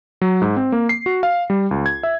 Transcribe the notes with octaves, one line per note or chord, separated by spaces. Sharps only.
F#3
G#2
C4
A#3
C7
F#4
F5
G3
C#2
G#6
E5